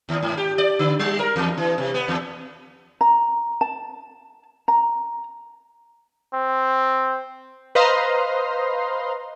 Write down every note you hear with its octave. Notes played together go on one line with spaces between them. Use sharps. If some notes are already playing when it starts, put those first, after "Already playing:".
D#2
G#2
G4
D5
D3
G3
A#4
E2
E3
C3
B3
E2
A#5
A5
A#5
C4
B4 C5 D#5 F5 A#5 C6